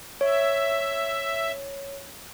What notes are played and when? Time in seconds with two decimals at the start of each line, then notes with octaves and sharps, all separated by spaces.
0.21 C#5 E5